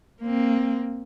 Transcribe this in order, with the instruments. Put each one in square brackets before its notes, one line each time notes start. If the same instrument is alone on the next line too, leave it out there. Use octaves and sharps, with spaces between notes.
[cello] A#3 C4